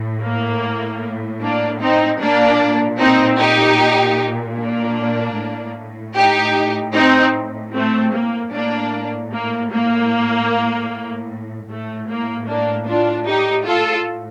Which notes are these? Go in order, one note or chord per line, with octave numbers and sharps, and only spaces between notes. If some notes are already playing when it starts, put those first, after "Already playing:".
Already playing: A2
A#3
A#3 D4
C4 D#4
A#2 A#3 D4
C4 D#4
D#4 G4
A#3 D4
A2
D#4 G4
C4 D#4
A3 C4
A#3
A2 A#3 D4
A#3
A#3
A2 A3
A#3
A#3 D4
D4 F4
D#4 G4
F4 A4